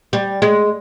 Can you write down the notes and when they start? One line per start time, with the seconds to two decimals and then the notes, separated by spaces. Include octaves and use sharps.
0.13 G3
0.42 G#3